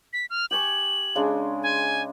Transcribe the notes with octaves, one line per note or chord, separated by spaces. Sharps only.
B6
F6
G4 G#5 C#6 F#7
C#3 G#3 D4
G#5